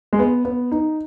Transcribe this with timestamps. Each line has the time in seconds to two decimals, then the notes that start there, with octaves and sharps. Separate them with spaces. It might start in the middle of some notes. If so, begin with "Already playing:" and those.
0.13 G#3
0.19 B3
0.45 B3
0.71 D#4